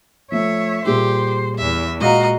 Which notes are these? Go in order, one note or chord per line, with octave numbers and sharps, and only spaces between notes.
F3 A3 C#5 E5
A#2 G3 G4 G#4 C5
E2 E5
A#2 G#3 F#4 D#5 F5 F#5 A#5